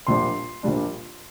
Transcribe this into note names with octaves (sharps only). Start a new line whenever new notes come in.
A#1 A#2 G3 D4 C6
A#1 A#2 G3 D4